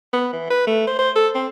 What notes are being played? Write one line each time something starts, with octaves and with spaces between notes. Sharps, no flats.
B3
E3
B4
A3
C5
C5
A4
C4